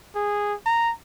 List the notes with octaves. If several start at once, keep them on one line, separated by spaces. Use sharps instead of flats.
G#4
A#5